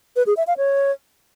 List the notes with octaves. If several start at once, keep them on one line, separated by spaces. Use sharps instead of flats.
B4
G#4
E5
F5
C#5